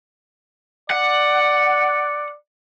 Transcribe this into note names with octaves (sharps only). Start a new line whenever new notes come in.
D5 F#5